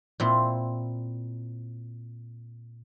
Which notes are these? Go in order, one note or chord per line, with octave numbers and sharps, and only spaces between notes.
A#2 C4 E4